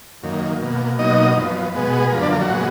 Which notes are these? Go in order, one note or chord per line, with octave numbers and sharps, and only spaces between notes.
F#2 D#3 A#3
B2 A#3
B2 F#3 A#3 D#4 D#5
F#2 F3 B3
B2 G#3 B3
F#4
G#4
A#4
F#2 D3 F3 B4
D4 D5
A#3 A#4
F#3 F#4
A#2 G#3 B3